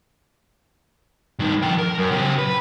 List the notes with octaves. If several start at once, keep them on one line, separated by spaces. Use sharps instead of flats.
G2 D#3
F3 G5
A#4
F#2
C#3 G4
B4